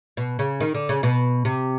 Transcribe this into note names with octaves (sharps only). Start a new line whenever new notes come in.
B2
C#3
D#3
D3
C#3
B2
C3